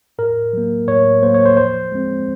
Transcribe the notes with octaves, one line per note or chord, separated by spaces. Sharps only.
A2 A#4
F#3 A#3
A2 C#5
F#3 A#3 C5
C#5
C5
F3 C5
G#3 C4